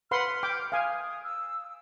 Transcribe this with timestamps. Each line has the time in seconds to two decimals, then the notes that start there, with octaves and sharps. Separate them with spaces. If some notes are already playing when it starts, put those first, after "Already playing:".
0.11 B4 F#5 C6 F6
0.43 G5 D6
0.72 F5 G#5 D#6
1.23 E6